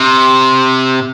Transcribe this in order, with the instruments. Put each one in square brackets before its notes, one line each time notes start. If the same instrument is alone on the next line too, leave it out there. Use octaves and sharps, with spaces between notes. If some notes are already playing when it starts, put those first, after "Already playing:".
Already playing: [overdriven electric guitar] C3